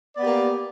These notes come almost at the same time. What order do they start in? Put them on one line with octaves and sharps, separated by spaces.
D5 B3 G4 A#3